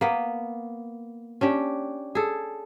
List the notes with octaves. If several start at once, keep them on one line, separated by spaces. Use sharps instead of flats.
A#3 B3
C#4 D4 G4
G#4 A4